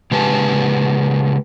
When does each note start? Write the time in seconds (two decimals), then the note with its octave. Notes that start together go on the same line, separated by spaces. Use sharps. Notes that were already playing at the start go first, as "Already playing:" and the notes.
0.11 C#3 G#3 G4 B4 G#5 A5